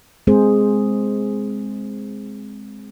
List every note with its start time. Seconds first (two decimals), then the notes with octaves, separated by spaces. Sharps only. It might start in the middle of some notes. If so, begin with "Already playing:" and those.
0.27 G#3 C4 G#4 C5